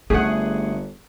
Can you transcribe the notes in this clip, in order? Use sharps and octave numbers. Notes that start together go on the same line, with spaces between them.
G1 A3 C#4 G#4 F#5